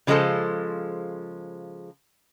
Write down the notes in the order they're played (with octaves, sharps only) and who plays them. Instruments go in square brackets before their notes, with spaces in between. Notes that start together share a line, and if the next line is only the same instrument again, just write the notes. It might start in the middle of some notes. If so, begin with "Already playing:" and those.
[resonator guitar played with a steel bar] C#3 F3 G#3 E4 A4 C5